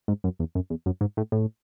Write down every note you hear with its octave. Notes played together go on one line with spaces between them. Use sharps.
G#2
F#2
E2
F#2
E2
F#2
G#2
A2
A2